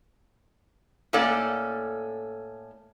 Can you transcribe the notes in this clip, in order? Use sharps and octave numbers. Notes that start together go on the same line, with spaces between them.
A2 A#3 C#4 A4 D5